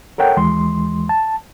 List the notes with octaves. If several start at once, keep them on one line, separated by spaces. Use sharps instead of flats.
A4 A#4 C#5 F#5 G5
D#2 E3 G#3 C6
A5